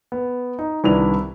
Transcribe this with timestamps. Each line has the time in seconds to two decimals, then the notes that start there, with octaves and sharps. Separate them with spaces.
0.12 B3
0.59 D#4
0.84 C2 D#3 D4 E4 B4 F7